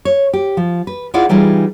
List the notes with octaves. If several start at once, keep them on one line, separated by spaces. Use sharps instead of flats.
C#5
G4
F3
B4
E4 F4 G#4 D5 F5 F#5
E3 G3 D#4 F4 G#4